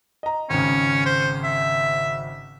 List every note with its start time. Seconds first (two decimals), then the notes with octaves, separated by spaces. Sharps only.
0.23 D#5 A#5
0.50 G#1 C#3 C#4
1.05 C5
1.44 E5